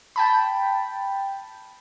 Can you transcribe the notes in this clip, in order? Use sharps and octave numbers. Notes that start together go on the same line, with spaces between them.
G5 A5 B5